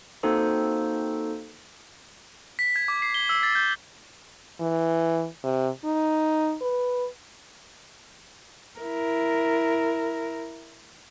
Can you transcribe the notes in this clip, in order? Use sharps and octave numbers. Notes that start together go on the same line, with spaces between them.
A#3 C4 D#4 F#4 A4 C5
B6
G#6
D6
C7
G7
E6
A6
G6
E3
C3
D#4
B4
E4 A#4